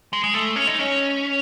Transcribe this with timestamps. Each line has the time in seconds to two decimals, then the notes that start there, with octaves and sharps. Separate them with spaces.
0.13 G#3
0.24 G#3
0.34 A3
0.56 C#4
0.68 D#4
0.79 C#4